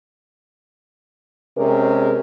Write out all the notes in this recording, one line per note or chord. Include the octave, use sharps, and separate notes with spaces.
C3 G#3 C#4 G#4 A#4